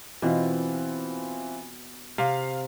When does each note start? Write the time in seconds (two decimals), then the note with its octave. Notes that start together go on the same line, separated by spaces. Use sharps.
0.22 B2 E3 C4 F4
2.18 C3 F5